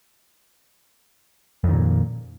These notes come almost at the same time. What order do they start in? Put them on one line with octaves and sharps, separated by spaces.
F2 D#3 A#2